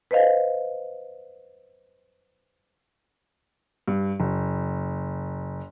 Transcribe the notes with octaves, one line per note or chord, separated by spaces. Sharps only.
B4 C5 D#5 F5
G2
F#1